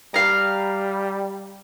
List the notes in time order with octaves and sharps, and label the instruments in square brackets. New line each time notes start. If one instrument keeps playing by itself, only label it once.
[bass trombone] G3 [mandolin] F5 A#5